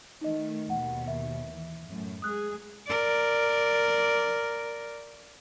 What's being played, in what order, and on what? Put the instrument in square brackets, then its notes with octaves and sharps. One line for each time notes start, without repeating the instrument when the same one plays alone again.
[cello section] D#3 A3 [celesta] D#4 D#5
[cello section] D#2 B2 [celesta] F#5
[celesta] E5
[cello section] E3
F#2 A2
[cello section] G#3 G#4 [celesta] D#6 F#6
[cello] A#4 D5